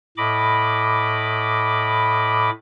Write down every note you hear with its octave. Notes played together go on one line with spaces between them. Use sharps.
A2 D#5 B5 D6